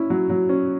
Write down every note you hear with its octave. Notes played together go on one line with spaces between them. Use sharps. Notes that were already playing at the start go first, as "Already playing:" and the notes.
Already playing: C#4 E4
F#3
F#3
C#4